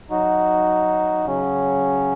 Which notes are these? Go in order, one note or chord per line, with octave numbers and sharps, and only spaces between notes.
F#3 D#4 F#4
C#3 F#3 C#4